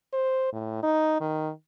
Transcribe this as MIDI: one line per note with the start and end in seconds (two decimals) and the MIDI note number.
0.13 0.53 72
0.53 0.82 45
0.83 1.20 63
1.21 1.50 51